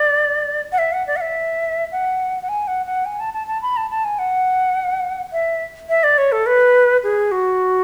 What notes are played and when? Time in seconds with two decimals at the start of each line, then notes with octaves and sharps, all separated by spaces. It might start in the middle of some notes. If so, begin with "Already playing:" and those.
Already playing: D5
0.72 F#5
0.78 E5
0.92 F#5
1.07 D5
1.16 F#5
1.21 E5
1.92 F#5
2.42 F#5
2.49 G#5
2.67 F#5
2.86 F#5
3.05 G#5
3.20 A5
3.33 A5
3.47 A5
3.62 B5
3.77 A5
3.90 A5
4.04 G#5
4.19 F#5
5.32 E5
5.89 E5
6.03 D5
6.18 C#5
6.32 A4
6.46 B4
7.03 G#4
7.31 F#4